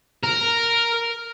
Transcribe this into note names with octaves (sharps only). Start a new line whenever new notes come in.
A#4